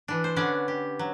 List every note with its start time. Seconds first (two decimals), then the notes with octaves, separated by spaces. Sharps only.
0.08 E3 D4
0.24 C5
0.36 D3 B3 C#4 D4 D5
0.68 G4
0.99 F#3